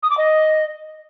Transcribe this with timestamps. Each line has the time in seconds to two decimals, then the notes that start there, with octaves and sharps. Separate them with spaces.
0.02 D#6
0.10 D6
0.17 D#5